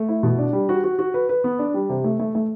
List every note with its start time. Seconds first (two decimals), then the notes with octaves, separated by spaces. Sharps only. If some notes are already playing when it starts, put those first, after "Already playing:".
Already playing: A3
0.08 E4
0.23 B2
0.38 D4
0.53 G3
0.69 F#4
0.84 F#4
0.99 F#4
1.14 B4
1.29 B4
1.44 B3
1.59 D4
1.74 G3
1.89 C3
2.04 A3
2.20 A3
2.35 A3